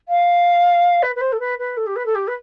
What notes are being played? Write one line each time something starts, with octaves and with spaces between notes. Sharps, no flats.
F5
B4
B4
C5
A4
B4
B4
A4
G4
B4
A4
G4
B4